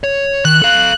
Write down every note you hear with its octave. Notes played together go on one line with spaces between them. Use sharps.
C#5
D#3 F#6
A4 F5